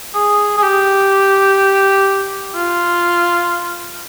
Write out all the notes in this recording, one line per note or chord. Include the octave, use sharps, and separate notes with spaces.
G#4
G#4
G4
F4